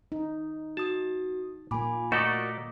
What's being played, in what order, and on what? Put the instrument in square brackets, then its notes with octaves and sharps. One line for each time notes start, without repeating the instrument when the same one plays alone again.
[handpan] D#4
[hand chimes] F#4 D#6 [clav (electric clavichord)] A5
[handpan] A#2 A#3 [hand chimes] G#5 B5 D6
[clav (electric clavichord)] A3 A4 [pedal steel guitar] F#4 A#4 D5 [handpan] D#5 [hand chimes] B6